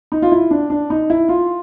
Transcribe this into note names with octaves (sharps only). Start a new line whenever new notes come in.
D#4
F4
E4
D4
D4
D#4
E4
F4